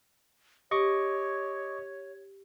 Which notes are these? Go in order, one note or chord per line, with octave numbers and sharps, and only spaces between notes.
G4 C#5 D#5 C#6 D6